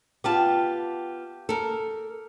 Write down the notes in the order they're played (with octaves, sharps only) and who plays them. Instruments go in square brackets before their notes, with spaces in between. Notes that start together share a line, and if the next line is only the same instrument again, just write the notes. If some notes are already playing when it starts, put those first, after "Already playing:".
[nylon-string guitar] B3 F4 A5 [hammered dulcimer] G4
[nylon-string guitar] A4 A#4